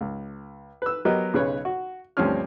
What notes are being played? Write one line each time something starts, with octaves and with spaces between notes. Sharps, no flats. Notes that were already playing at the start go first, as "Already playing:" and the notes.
C#2
B4 E6
F#3 B3 G4 A#4 D#5
B1 C#3 B4 C#5
F#4
D2 G2 F3 C4 C#4 F6